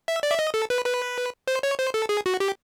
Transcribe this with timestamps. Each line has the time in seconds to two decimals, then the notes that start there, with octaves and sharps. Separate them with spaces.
0.08 E5
0.23 D5
0.31 E5
0.39 D#5
0.54 A4
0.70 B4
0.86 B4
1.48 C5
1.63 C#5
1.79 C5
1.94 A4
2.09 G#4
2.26 F#4
2.40 G4